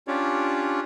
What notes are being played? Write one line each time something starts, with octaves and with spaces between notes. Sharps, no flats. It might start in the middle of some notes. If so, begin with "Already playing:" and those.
C#4 D4 F4 G4 C#5 D5